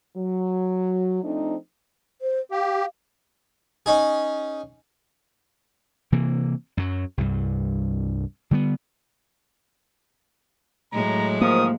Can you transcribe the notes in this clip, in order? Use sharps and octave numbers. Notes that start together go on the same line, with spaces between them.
F#3
F3 A3 C4 D4 D#4
C5
G4 F5
C#4 D#4 G#4
C3 E3 A#3
F#2 F#3
C2 G2
D3 G3 A3 B3
A2 F#3 G#3 A#5
G#2 D#3 F3 A#3 D#6